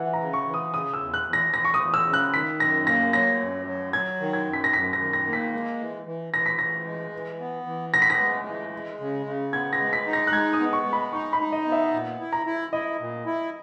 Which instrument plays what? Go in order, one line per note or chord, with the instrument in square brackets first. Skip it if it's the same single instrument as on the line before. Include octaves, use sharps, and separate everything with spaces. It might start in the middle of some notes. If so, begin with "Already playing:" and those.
Already playing: [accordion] E3 [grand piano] E5 F#5 G#5
[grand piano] A#5
[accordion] C#3
[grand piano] C#6
[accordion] E3
[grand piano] D#6
[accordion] C#3 [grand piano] D#6
[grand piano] E6
[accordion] E2
[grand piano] F#6
[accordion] E2
[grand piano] A#6
[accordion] E2 [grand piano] A#6
[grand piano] C#6
D#6
[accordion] E2
[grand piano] E6
[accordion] C#3
[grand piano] F#6
[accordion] D#3 [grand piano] B6
[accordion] F#2 [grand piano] A#6
[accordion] A#3 [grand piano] A#6
[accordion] F#3 [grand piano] A#6
[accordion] F#2
F#3
[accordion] F#3 [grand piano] G#6
[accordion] D#3
[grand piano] G#6
[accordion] F#2
[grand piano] B6
A#6
[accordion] F#2 [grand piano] B6
[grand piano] A#6
[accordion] D#3
[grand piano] A#6
[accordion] A#3
[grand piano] B6
[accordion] G#3
E3
E3
[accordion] E3 [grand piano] A#6
[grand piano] B6
[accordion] E3 [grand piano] A#6
[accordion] G#3
E3
B3
E3
[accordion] B3 [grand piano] A#6
[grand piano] B6
A#6
[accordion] G#3
E3
G#3
C#3
C#3
[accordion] B3 [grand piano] G#6
[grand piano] A#6
[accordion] G#3
[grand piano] B6
[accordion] D#4
[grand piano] A#6
F#6
[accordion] G#3 [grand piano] G#6
[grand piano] D#6
[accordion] B3
[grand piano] C#6
[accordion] G#3
[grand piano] B5
[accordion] D#4 [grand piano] C#6
[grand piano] B5
[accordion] D#4
[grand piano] D#5
[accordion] B3
[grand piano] E5
[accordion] A#2
E4
[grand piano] A#5
[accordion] E4
[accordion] E4 [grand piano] D#5
[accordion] A#2
E4